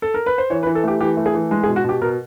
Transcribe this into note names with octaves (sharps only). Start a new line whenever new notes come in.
A4
A#4
B4
C5
E3 C#5
B4
E3
A4
A3 G4
E3 G4
A3
G#4
E3
G#3
G#4
B2
F#4
B2 G4
B2 A#4